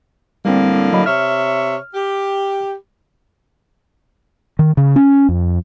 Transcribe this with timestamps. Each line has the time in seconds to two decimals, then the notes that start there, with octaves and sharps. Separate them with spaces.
0.45 A2 D3 G3 A#3 C4
0.93 F#3 D#5 B5
1.06 C3 C#5 E5 F6
1.94 G4
4.59 D#3
4.77 C#3
4.96 C#4
5.29 F2